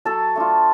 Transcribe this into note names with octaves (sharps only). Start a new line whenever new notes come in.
F#3 A4 A5
A3 D4 F4